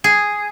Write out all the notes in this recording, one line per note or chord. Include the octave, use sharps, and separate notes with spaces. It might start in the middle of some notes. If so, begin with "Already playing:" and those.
G#4